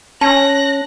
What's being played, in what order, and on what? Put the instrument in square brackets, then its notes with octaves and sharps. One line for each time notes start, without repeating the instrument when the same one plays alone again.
[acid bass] C#4 [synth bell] A5 [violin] F#6 A#6